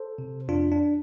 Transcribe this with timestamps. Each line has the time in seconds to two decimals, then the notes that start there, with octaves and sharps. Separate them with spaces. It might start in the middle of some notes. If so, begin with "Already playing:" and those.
Already playing: A4 C5
0.18 C3
0.48 F2 D4 F4
0.72 D4